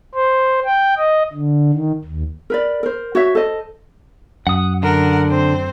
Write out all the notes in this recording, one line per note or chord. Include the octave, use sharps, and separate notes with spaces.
C5
G5
D#5
D3
D#3
D#2
A#4 B4 D5
A#4 C5
F#4 C#5 E5
A4 C5 D#5
F#2 F#5 D#6
D3 A#4 F#5
C4 C5